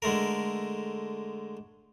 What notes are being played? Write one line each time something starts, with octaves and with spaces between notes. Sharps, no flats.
D3 G#3 A3 A#4